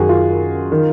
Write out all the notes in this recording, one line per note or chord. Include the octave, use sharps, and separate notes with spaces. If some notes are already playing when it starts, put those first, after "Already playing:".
Already playing: F#2 D#3 F#4 G#4
F4
D#3